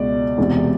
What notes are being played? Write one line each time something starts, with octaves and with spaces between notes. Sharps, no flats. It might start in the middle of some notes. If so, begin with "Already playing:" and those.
Already playing: C#2 B2 D5
E1 E2 C3